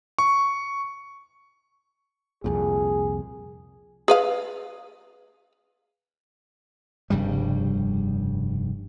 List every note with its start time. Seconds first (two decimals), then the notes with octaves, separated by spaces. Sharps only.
0.19 C#6
2.44 C2 F2 A#2 G#4
4.08 G#4 B4 F5
7.10 F1 G2 C#3 G3